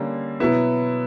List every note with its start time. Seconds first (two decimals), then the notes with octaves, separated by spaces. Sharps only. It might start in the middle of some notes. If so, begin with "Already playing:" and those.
Already playing: D3 G3 A#3 C#4
0.40 B2 F#3 B3 E4